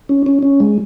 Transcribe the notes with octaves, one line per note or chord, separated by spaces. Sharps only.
C#4
C#4
C#4
G#3